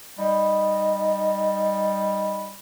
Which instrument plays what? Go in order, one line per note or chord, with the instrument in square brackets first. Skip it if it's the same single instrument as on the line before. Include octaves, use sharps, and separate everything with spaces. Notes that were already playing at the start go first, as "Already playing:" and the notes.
[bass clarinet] G3 [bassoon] D#4